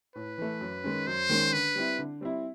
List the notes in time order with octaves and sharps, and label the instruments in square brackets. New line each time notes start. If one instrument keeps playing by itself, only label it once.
[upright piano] A2 [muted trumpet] B4
[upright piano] E3 A3
F#2
D#3 G#3 C#4
[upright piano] F#2 [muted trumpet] C5
[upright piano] D#3 G#3 C#4
[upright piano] D3 [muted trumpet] B4
[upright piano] G3 C4 E4
D3
G3 C4 E4